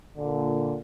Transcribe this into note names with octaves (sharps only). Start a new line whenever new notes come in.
A#2 D3